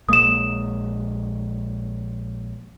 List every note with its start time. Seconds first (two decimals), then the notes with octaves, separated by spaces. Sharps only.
0.09 A#1 G#3 A#3 D#6 E7